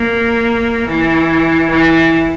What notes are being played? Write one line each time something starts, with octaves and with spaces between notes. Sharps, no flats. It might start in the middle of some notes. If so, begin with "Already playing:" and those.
Already playing: A#3
E3
E3